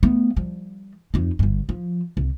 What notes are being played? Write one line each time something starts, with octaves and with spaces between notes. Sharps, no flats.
A3 B3
F3 G3
F2 D#4
G1 G2
F3
C2